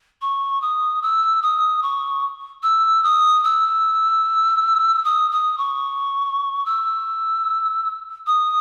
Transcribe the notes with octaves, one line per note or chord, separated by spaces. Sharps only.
C#6
D#6
E6
D#6
C#6
E6
D#6
E6
D#6
D#6
C#6
E6
D#6